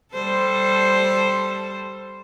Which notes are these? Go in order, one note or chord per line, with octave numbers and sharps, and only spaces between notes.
G3 A4 C5